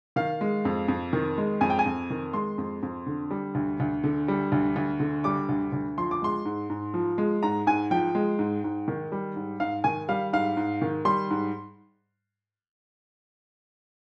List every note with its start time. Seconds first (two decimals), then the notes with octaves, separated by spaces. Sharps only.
0.16 D#3 F5
0.41 G#3
0.65 F2
0.88 F2
1.13 D#3
1.38 G#3
1.61 F2 G#5
1.70 G5
1.79 G#5
1.86 F2
2.10 D#3
2.33 G#3 C6
2.58 F2
2.83 F2
3.06 D3
3.31 G3
3.55 D2
3.80 D2
4.04 D3
4.28 G3
4.52 D2
4.76 D2
5.00 D3
5.24 G3 D6
5.49 D2
5.72 D2
5.98 F3 C6
6.11 D6
6.22 G#3 C6
6.45 G#2
6.70 G#2
6.94 F3
7.18 G#3
7.43 G#2 A#5
7.67 G#2 G#5
7.91 F3 G5
8.15 G#3
8.39 G#2
8.64 G#2
8.88 D#3
9.12 G3
9.36 G#2
9.60 G#2 F5
9.84 D#3 G#5
10.09 G3 F5
10.33 G#2 F5
10.57 G#2
10.82 D#3
11.05 G3 C6
11.30 G#2